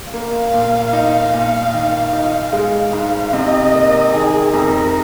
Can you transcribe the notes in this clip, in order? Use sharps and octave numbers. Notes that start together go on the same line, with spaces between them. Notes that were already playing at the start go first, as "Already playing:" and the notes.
A#3 F5
A#2
D#4
A#2
D#3
D#4
G#3 F5
G#2
C3 D#5
A#3
D#3 G#4
F2 A#4